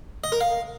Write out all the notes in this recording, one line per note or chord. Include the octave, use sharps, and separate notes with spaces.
D#5
A#4
F5